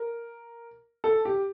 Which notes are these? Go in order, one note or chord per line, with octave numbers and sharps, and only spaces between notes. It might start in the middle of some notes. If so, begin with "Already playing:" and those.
Already playing: A#4
A4
G4